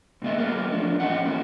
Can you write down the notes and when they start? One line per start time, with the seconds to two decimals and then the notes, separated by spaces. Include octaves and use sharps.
0.22 G#2 C#3 A#3 D#5 E5
0.38 F#3 A3 A#4 B4 F5
0.72 E2 F3 D4
1.00 A2 E3 C#4 D#5 F#5
1.25 A3 A#3 E4 F#4